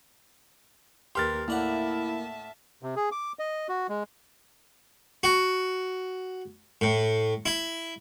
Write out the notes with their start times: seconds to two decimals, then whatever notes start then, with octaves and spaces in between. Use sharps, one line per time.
1.15 D#2 G4 A#4 B4 C6 F6 A6
1.48 A2 A#3 E4 D5 E5 F#5 A5
2.83 C3
2.96 G#4
3.12 D6
3.39 D#5
3.69 F#4
3.89 G#3
5.23 F#4
6.81 A2
7.46 E4